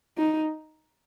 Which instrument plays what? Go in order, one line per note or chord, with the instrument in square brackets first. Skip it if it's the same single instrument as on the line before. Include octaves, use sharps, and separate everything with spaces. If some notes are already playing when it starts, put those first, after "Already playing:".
[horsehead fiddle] D#4